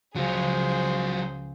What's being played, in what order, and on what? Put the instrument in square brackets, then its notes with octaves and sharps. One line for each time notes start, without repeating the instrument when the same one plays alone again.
[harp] C#2 C#3 F3 [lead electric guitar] F#3 F4 [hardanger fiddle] G#4 C5